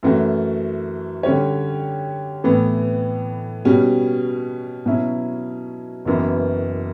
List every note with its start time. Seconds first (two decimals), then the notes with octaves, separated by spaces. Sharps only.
0.03 F#2 E3 A3 C#4 F#4
1.23 D3 G3 C#4 G4 C#5
2.44 A2 E3 B3
3.65 B2 G3 C#4 F#4
4.86 B2 F#3 C#4 E4
6.05 F#1 F#2 E3 B3